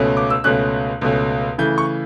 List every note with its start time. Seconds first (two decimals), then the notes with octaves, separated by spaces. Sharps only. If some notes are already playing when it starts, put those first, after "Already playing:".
Already playing: C#2 B2 A3 C#4
0.17 D6
0.30 E6
0.44 C#2 B2 A3 C#4 F#6
1.01 C#2 B2 A3 C#4
1.58 C#3 E3 A3 G6
1.78 C#6